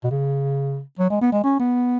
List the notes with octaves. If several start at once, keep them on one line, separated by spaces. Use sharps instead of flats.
B2
C#3
F#3
G#3
B3
G#3
C#4
B3